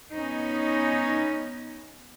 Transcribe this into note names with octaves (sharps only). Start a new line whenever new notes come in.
B3 C#4 D#4